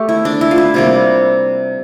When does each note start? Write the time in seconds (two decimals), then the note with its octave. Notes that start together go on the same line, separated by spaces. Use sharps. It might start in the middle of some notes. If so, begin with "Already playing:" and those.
Already playing: A3 G4
0.09 E4
0.25 D4
0.41 E4
0.51 F4
0.58 E4
0.74 C3 G3 A#3